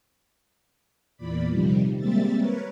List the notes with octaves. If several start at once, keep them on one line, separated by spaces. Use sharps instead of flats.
E2 A#2 D5 B5
C3 D#3 F3 G3
G3 G#3 A#3 C4 E5 A6
A#4 B4 C#5